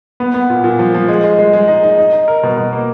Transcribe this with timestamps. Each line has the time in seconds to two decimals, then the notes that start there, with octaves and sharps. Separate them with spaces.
0.20 B3
0.34 B3
0.50 A#2
0.64 A#2
0.79 F3
0.94 F3
1.08 G#3
1.24 G#3
1.39 G#3
1.53 G#3
1.68 D#4
1.83 D#4
1.99 D#4
2.13 D#4
2.28 A#4
2.43 B2
2.57 B2
2.73 A#3